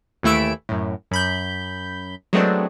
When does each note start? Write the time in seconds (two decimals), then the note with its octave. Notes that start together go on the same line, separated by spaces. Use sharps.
0.23 D#2 E3 A3 E4 E6 D7
0.69 F#2 A2
1.11 F#2 B5 G6
2.33 F#3 G#3 A3 B3 C4 D4